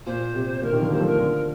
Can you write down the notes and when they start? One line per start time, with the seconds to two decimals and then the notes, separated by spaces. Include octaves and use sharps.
0.06 A#2 C5
0.34 C3
0.62 A#2 D3 A#4
0.72 C3 D#3
0.81 D3 F3 A#4
0.91 G3 A#3 C5
1.00 F3 A3
1.05 A#4
1.19 D3 F3